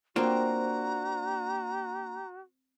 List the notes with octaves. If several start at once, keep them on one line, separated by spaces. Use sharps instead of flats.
A#3 C4 D4 F4 F#4 A#5